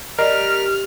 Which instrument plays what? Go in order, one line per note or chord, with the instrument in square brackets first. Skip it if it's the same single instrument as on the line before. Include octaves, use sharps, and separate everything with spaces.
[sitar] G3 [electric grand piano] A#4 [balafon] D5 D#5 [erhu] F6